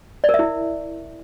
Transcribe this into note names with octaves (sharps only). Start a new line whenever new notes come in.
D5
A#4
E5
E4